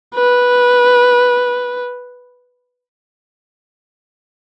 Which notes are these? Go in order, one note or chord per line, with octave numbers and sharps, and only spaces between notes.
B4